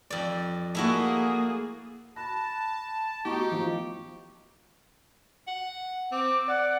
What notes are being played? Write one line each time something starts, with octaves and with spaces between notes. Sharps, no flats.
F2 D5
A3 A#3 E4 F#4 G#4
A5 B5 F#6 A#6
A3 B3 D#4 E4 F#4 G4 C#6
F3
F#5
C4 D6
D5 F#5